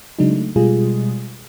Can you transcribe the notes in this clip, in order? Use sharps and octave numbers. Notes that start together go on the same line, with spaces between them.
C#3 F#3 G#3 D4 D#4
A3
B2 G3 G#3 F4 G#4